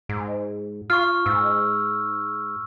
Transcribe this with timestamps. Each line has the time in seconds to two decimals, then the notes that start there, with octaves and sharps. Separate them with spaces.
0.09 G#2
0.90 F4 C#6 F6
1.26 G#2 E6